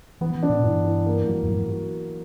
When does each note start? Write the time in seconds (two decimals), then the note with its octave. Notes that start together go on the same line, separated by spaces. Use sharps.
0.21 E3 B3
0.35 E3
0.43 D4
0.50 A#2
0.64 G2 E3
0.85 E3
1.06 A#3
1.27 F#3
1.43 F#2
1.48 G2 F#3
1.70 F#4